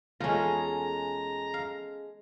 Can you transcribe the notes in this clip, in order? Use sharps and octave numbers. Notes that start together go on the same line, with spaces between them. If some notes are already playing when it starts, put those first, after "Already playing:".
E2 G#3 A3 C#4 D#4 F4 A4 A#5
F5